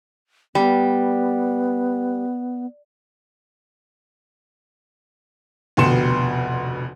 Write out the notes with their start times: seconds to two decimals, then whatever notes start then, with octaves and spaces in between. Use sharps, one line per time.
0.55 G3 B3
5.77 F1 D2 B2 C6 C#7 E7